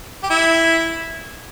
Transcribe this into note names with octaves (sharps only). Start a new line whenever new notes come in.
G4
E4